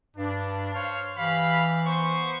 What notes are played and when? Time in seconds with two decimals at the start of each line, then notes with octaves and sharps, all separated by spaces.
0.16 G2 D4
0.73 C5 C#5 F5
1.16 E3 G4 F5 B5
1.85 B3 C5 C#6